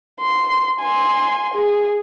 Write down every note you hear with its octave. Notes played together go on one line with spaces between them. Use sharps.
C6
G#5 C6
G#4